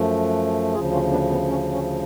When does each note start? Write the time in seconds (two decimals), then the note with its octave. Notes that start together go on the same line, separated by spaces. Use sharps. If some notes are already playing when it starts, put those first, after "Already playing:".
Already playing: F#2 F3 A3
0.74 D2 C#3 F3 F4 G#4
0.92 C#4 F4
1.11 B3 D4
1.30 B3
1.48 C#4
1.72 C#4